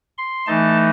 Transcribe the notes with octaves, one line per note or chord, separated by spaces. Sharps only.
C6
E3 A3 D#4 A5